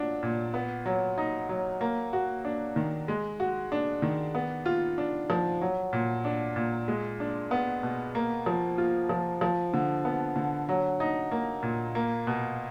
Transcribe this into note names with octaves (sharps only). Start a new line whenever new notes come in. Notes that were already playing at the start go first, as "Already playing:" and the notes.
Already playing: F#3 D4 F4
A#2
B3
F#3
D#4
F#3
A#3
F#4
D4
D#3
G#3
F#4
D4
D#3
B3
F4
D4
F3
F#3
A#2
D4
A#2
G#3
D4
B3
B2
A#3
F3
F4
F3
F3
D3
B3
D3
F#3
D#4
A#3
A#2
A#3
B2